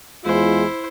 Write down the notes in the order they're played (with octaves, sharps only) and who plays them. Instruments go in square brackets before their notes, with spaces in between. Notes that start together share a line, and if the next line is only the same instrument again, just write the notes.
[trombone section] E2 G#3 F4 [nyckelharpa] E4 C5